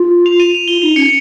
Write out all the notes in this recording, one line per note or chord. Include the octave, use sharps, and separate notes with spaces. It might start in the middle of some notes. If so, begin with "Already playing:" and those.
Already playing: F4
F7
D#7
F7
F4 G7
D#4 F7
C#4 C#7